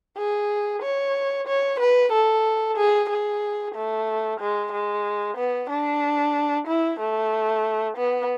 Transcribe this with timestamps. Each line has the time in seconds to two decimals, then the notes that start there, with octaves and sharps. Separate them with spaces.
0.17 G#4
0.83 C#5
1.47 C#5
1.80 B4
2.12 A4
2.77 G#4
3.10 G#4
3.75 A3
4.40 G#3
4.72 G#3
5.37 B3
5.70 D4
6.67 E4
7.00 A3
7.97 B3